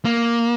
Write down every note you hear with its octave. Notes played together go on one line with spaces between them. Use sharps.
A#3